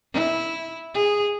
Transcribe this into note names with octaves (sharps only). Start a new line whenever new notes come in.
E4
G#4